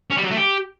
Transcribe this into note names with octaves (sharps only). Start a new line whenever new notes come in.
C#4
G3
F#3
A3
G4